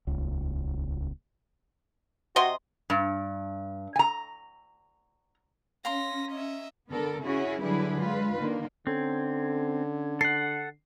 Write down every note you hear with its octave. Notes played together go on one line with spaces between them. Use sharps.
D#1 C#2
C3 F#4 D#5 C6
G2
G#5 A#5
C#4 F5 A#5 C6 A#6 B6
D#5 E5
D3 B3 A4 A#4
C#3 C#4 E4 F#4 G#4
D3 F#3 G3 E4 G#4 B4
G#3 F4 B4
D3 D#3 A#3
D3 C4 C#4 A4 G#6
A4 F#5 C7